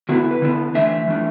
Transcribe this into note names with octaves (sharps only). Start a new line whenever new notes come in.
D3 B3 E4 F#4
B4
D3 B3 E4
E3 A3 D4 E5
E3 A3 D4